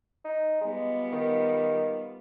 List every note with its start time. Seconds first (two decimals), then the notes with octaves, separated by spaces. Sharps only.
0.25 D#4
0.61 G3 G#3 B3 F4
1.13 D#3